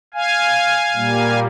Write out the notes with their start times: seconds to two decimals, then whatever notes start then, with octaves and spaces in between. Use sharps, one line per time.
0.14 F5 G#5
0.94 A#2 G3 A#3